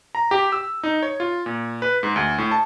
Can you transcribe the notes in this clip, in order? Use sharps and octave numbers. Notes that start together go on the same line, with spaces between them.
A#5
G4
E6
D#4
C#5
F4
A#2
B4
G#2
D2
A2
A5